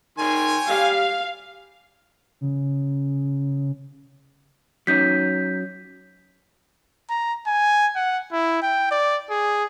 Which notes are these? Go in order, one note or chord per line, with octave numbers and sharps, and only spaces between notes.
D#3 C#5 G5 G#5 C6
G3 F5
C#3
F#3 C#4 D#4 G6 B6
A#5
G#5
F#5
E4
G5
D5
G#4